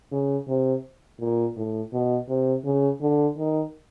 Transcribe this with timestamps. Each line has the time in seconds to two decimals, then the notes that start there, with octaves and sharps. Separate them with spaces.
0.12 C#3
0.48 C3
1.20 A#2
1.57 A2
1.93 B2
2.29 C3
2.65 C#3
3.02 D3
3.38 D#3